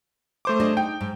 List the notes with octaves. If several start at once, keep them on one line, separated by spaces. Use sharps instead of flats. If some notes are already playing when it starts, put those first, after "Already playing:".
A3 C5 D6
D4 G#4 D#5
D#4 G5
G#2